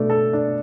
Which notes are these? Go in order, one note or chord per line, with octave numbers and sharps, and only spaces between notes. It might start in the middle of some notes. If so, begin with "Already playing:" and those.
Already playing: B2 A3 D4
A4
D4